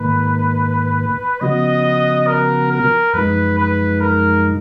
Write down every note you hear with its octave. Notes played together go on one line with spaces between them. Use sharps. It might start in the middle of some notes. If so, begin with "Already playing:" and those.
Already playing: G#2 D#3 A#3 B4
C#3 F3 B3 F#4 D#5
A#4
A#4
F#2 F3 G#3 D#4 B4
B4
A#4